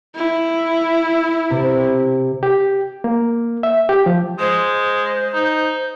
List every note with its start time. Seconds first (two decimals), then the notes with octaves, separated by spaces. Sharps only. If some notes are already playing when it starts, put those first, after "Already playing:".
0.15 E4
1.50 C3
2.43 G4
3.04 A#3
3.63 E5
3.89 G4
4.06 F3
4.39 G#3 C5
5.34 D#4